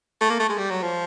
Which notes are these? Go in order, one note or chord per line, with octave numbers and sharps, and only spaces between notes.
A3
A#3
A3
G#3
G3
F#3
F3